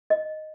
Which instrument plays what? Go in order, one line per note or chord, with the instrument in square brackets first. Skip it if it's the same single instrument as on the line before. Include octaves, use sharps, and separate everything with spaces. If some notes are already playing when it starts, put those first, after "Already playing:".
[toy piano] D#5